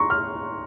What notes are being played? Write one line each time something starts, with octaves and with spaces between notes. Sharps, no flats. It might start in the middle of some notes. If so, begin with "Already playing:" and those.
Already playing: A#3 A#5 C6 C#6
F6